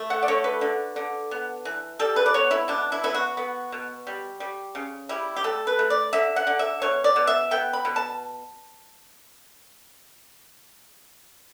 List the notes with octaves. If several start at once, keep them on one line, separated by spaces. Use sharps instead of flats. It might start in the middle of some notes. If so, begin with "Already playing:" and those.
Already playing: A3
F#5
D5
D3 C#5
B4
D3
D3
B3
E3
G3 A4
B4
D5
B3 C#5
E4
B2 D4
E4
B3 E4
F#4
B3
B2
G3
G3
C#3
G3 E4
G4
A3 A4
B4
A3
D5
D3 E5
F#5
D3
E5
B2 C#5
D5
B2
E5
B3 G5
B5
B2
A5